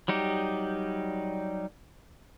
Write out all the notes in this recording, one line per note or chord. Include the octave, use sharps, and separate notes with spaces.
F#3 G3 D#4 G4